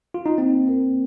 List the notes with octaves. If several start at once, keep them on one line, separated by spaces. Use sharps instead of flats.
F4
D#4
A#3 C4
A#4